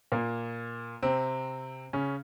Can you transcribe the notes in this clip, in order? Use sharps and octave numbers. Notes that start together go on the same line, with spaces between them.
A#2 A#3
C3 C4
C#3 C#4